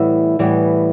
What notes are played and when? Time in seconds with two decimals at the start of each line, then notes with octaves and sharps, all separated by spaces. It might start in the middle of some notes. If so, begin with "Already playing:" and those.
Already playing: A2 E3 G3 B3 E5
0.39 A2 E3 G3 B3